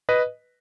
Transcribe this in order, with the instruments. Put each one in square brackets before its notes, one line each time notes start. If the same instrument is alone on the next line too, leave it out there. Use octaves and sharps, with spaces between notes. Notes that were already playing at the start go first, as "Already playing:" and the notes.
[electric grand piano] B4 D#5